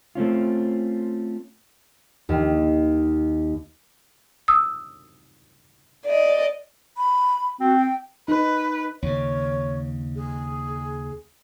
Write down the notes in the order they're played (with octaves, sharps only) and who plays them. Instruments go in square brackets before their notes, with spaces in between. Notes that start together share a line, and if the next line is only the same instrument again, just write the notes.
[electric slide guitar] A3 C4 C#4 F4
[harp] D#2
[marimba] D#6 E6
[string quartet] D5 D#5
[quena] B5
[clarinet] C4 [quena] F#4
[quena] G5
[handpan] D#4 [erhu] B4
[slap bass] D#2 C#3 [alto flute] C#5
[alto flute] G#4